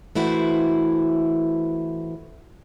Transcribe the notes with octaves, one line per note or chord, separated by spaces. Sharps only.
E3 A3 E4 F#4 C5